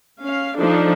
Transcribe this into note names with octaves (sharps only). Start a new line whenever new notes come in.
C#4 F5
F3 D4 D#4 A4